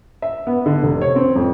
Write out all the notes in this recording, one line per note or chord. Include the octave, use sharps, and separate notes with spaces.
E5
B3
D3
F1
C#5
C4
F2